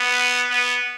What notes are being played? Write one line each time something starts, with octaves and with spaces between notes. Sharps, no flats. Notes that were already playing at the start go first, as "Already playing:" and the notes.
Already playing: B3
B3